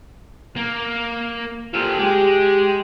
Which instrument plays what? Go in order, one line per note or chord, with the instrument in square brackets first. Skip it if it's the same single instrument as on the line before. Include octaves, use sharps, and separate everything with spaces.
[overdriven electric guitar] A#3
[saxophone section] A#2 C4 F4 [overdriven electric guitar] G4 A4
[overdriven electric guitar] G#3 [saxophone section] G4